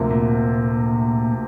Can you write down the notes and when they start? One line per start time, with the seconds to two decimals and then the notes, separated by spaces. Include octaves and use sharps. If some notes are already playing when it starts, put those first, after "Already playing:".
Already playing: D2 C3 F3 A#3
0.11 A#2